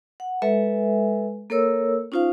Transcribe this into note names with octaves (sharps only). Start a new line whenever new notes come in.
F#5
G#3 A4 B4 E5 G#5
A#3 A4 A#4 C#5 E6
C#4 D#4 F4 C5 F5